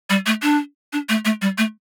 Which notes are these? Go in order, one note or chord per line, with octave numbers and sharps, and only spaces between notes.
G3
A3
D4
D4
A3
A3
G3
A3